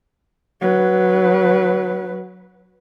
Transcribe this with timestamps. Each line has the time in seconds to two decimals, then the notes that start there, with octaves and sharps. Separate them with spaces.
0.61 F#3 B4